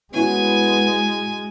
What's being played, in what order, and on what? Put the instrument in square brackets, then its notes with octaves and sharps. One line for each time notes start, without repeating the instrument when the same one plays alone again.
[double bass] G#3 [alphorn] B3 [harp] C#4 E4 F#4 [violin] G#5